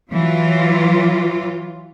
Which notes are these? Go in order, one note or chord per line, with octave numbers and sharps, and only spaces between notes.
E3 F#3 F4